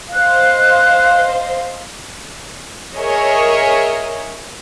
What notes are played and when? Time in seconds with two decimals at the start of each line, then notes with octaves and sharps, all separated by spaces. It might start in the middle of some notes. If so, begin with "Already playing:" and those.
0.13 C5 D#5 F5 F#6
2.96 G#4 A#4 C#5 D#5 E5